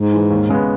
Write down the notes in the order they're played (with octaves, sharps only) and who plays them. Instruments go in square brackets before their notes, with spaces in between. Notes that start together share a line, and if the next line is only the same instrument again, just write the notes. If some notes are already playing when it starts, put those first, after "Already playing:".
Already playing: [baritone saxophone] G#2
[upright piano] E3 G#3
D#2
C#3 G#3 B3